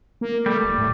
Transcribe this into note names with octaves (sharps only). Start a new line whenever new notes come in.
A#3
G3 A3
D1
A2